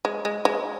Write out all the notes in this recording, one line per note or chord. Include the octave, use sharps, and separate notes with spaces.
G#3
G#3
G#3